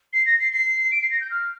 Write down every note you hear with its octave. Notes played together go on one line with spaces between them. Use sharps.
C7
A#6
C7
C7
D7
C7
A#6
G6
F6